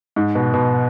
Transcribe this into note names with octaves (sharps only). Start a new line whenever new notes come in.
G#2
B2
B2